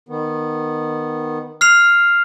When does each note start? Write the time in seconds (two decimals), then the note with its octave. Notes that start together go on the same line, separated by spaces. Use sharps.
0.09 D#3 B3
1.61 F6 C7 F7